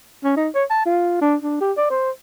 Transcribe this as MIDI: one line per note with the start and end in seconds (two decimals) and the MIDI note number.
0.24 0.37 61
0.37 0.49 63
0.55 0.64 73
0.70 0.85 81
0.86 1.20 65
1.21 1.36 62
1.42 1.58 62
1.61 1.72 67
1.77 1.88 74
1.90 2.11 72